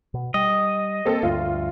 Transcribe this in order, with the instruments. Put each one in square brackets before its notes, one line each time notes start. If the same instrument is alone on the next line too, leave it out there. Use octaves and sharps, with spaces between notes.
[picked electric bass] B2
[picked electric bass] G3 [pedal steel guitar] D#5
[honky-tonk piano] A#3 C4 A4
[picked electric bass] D2 G2 [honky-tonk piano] F4